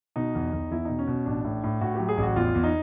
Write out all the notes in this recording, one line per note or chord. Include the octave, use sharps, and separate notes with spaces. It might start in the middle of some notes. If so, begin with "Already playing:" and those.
B2 D#4
E2
E2
E2 E4
B2 D#4
C#4
B2
C#4
A1 D4
A2
A2
A2 F#4
F#3 G4
G#4
A1
F#4
E2 F4
E2
D#4